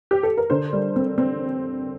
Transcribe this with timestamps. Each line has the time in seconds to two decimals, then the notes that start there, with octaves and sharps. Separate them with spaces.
0.11 G4
0.23 A4
0.37 A#4
0.50 D3 C5
0.73 G3
0.96 C4
1.18 C4